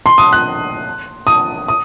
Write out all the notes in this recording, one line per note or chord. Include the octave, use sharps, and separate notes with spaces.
C6
D#6
F#6
D#6
D#6